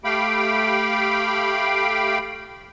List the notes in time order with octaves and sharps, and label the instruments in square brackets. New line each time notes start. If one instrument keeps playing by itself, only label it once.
[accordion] A3 G4 F5 G5 B5